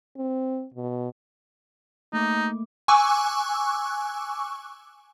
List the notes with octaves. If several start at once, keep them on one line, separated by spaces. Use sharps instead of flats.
C4
B2
A3 A#3 D#4 D6
G#5 C#6 D6 E6 F#6